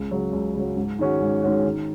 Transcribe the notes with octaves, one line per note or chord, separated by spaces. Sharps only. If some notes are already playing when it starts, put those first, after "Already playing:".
Already playing: C#2
C#3 F#3
C#2
C#3 F#3
G#2
D#3 G#3 C#4 F#4
G#2
D#3 G#3 C#4 F#4
D#3